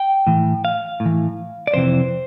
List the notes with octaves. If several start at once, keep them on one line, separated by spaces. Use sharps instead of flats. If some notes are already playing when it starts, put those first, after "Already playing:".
Already playing: G5
A2 E3
F5
A2
E3
D5
F2 C3 E3 C5